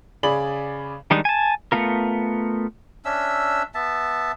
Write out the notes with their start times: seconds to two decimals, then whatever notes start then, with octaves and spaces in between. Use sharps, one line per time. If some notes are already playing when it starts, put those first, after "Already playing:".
0.23 C#3 G#4 D5 B5 F#7
1.10 D#3 G3 G#3 D4 D#4
1.25 G#5 A5
1.72 A3 B3 F4 A#4
3.05 C#4 D4 E5 E6
3.75 B3 E5 A5